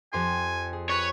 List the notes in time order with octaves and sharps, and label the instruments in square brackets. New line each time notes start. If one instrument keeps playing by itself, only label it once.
[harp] F2 G4 C6 [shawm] G#5
[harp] G#4
[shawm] B4 [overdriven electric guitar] C#5